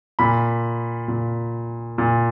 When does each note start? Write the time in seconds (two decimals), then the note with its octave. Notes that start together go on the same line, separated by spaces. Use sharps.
0.19 A#2 B5
1.08 A#2
1.98 A#2